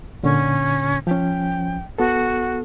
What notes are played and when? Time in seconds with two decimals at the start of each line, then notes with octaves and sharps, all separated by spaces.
0.23 A#2 D3 C#4
1.07 F3 C#4 G5
1.98 B3 F#4 A4